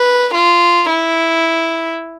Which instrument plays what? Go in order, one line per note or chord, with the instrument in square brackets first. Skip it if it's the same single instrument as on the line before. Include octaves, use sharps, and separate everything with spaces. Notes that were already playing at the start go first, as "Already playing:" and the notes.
Already playing: [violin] B4
F4
E4